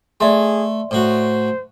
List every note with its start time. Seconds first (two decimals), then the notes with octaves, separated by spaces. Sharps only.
0.21 A3 G#4 D5 E5 C6
0.91 A2 F#4 C5